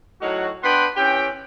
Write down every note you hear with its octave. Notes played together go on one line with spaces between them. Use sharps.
A2 F#3 D#4 F#4
B3 D4 B4 F#5 G5 C6
E3 C#4 G4 G5